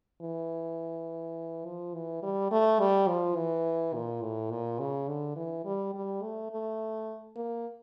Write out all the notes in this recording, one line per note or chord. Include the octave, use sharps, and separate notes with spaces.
E3
F3
E3
G3
A3
G3
F3
E3
A#2
A2
A#2
C#3
D3
E3
G3
G3
A3
A3
A#3